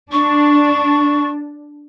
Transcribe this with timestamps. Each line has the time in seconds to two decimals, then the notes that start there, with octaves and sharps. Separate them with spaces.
0.12 D4 C#6